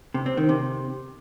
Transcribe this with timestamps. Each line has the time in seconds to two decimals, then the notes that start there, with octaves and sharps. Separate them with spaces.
0.14 C3
0.26 C4
0.37 D#3
0.49 C3